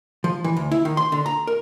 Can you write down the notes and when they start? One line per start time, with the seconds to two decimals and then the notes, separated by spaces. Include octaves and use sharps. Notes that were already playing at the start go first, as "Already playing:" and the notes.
0.24 F3
0.44 E3
0.57 D2
0.71 E4
0.85 D#3
0.97 C6
1.12 D3
1.26 A#5
1.47 A#4